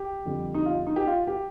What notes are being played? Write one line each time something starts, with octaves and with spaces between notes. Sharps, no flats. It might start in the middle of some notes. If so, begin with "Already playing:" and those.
Already playing: G4
F2 D3 G3
D#4
F4
D#4
G4
F4
G4